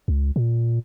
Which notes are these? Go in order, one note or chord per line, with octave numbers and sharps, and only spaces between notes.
C#2
A#2